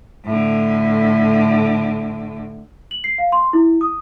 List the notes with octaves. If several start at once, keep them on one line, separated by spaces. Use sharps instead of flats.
A2 D3
F#7
C7
F5
C6
E4
D#6